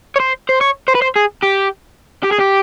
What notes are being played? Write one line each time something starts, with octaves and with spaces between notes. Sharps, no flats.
C#5
C5
C5
C#5
C5
B4
C5
G#4
G4
G4
G#4
G4